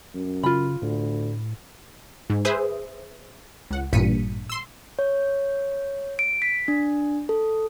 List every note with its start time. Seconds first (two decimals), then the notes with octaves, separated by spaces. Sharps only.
0.15 F#2
0.43 C#3 F4 B5
0.82 D2 A2
2.30 G#2
2.45 G#4 B4 C5 E5 D#6
3.71 C#2 F#5
3.93 A1 G2 A#2 B6 C#7 D#7
4.50 C6 E6
4.99 C#5
6.19 D7
6.42 B6
6.68 D4
7.29 A4